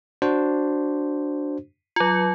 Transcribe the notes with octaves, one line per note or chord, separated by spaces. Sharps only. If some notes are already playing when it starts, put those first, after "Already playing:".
D4 F#4 C5
F#3 F4